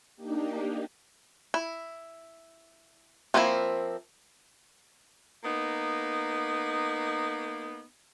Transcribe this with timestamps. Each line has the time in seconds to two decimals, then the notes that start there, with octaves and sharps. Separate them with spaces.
0.16 A#3 D4 D#4 G4
1.54 E4
3.34 F3 A#3 C4 D#4 E4
5.44 A#3 B3 D#4